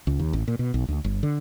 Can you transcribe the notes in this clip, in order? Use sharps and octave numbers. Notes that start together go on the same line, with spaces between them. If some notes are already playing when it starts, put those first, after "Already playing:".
C#2
D#2
A1
A#2
B2
B1
D2
G1
D3